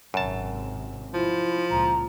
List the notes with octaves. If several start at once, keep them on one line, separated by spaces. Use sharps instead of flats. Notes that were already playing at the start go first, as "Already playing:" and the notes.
G#1 F#2 C3 A5
F3 E4
C#2 A#2 A#5